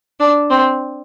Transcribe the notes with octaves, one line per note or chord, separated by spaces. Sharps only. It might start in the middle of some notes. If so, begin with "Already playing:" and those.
D4
C4